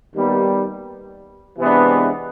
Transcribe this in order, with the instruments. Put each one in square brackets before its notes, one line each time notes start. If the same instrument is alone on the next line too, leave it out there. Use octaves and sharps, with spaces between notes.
[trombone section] D#2 D#3 G3 B3
C3 E3 G#3 B3 D4